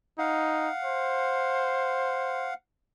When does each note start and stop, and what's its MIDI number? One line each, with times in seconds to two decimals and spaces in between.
0.19 0.69 63
0.19 2.54 77
0.19 2.54 78
0.84 2.52 72